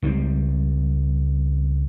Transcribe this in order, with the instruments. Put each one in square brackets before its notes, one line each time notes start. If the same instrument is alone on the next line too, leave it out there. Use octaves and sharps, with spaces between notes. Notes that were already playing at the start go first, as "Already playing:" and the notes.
[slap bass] C#2 G3 A3 C4